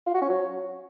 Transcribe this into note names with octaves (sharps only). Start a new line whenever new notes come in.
F4
F#4
C#4
F#3